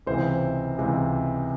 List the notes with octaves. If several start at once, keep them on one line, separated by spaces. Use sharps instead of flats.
C#2 C3 E3 C5
C#2 C3 E3